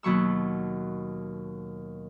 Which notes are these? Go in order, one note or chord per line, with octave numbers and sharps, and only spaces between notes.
D#2 B2 F#3 C#6 E6